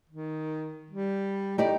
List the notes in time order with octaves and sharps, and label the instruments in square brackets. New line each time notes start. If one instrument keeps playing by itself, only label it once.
[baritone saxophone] D#3
G3
[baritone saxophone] A2 [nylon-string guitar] D#4 G4 D5